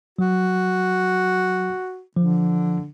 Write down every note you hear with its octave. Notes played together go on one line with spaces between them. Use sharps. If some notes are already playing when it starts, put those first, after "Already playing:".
F#3 F#4
D3 F3